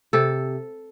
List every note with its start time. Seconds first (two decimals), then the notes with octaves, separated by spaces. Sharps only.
0.13 C3 A4